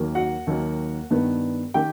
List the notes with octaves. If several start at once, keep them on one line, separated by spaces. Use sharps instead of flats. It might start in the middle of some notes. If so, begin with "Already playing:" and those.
Already playing: D#2 D#3 F#3 A#3
F#4 F#5
D#2 D#3 F#3 A#3
G2 D#3 G3 B3
D#3 G4 G5